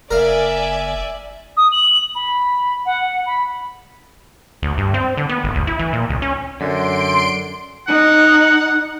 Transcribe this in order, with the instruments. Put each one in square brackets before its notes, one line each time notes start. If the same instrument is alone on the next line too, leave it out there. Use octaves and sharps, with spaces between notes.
[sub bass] F#1 [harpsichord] A#4 F5 [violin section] D5 E5 G#5
[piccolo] D#6
F#7
B5
F#5
B5
[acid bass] D2
G2
C4
D3
B3
G#1
D2
E4
E3
A#2
C#2
C#4
[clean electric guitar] F#2 [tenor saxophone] D3 [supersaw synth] C6 D7
[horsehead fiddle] D#4 [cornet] F#5